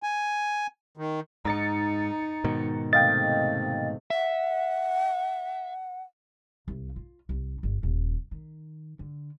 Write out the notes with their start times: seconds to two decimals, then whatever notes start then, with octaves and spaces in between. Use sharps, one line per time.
0.03 G#5
0.97 D#3
1.45 G#2 D#4 A#5 A6 C#7
2.44 G#2 B2 D#3
2.93 C3 A3 D#5 F5 G5 A6
4.10 E5 F#5
6.68 C2
6.96 F4
7.29 C2
7.63 G1
7.83 D#1
8.31 D#3
8.99 D3